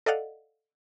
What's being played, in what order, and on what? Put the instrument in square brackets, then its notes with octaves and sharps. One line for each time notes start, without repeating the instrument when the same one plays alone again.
[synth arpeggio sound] A4 D5 D#5 F5 F#5